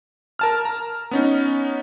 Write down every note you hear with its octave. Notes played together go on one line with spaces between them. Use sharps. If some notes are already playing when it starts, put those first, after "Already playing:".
A#4 A5 F6
A#5
B3 C#4 D#4